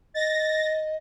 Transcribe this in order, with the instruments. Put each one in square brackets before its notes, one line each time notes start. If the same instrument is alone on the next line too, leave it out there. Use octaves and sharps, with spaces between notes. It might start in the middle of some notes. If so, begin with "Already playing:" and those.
[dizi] D#5 [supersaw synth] A6 A#6